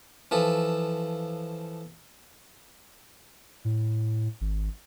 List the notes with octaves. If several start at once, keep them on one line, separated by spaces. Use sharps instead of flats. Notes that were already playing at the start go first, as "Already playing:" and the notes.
E3 F3 A4
A2
G#1